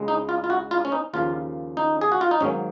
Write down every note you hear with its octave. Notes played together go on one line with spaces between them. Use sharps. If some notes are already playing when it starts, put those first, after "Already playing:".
Already playing: C#2 C#3 G#3
D#4
F4
F4
F#4
F4
C#4
D#4
D#2 C#3 F3 A#3 F4
D#4
G#4
F#4
F4
D#4
G#1 G#2 F#3 A#3 C#4